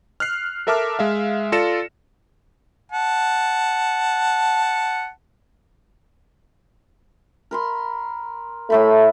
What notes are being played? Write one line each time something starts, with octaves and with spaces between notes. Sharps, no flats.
F6 F#6 C7
A4 A#4 E5 A5 D6 F6
G#3 E5 F5
F4 A4 D5 A#6 C#7 E7
F#5 A5
A#4 B5 C6
A2 A3 E5 B5